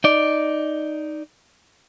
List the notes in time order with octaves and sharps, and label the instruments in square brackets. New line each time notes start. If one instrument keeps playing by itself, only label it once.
[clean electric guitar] D#4 D5